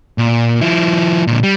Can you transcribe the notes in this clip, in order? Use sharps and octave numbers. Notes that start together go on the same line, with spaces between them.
A#2
F3 E4
A#2 D3
G3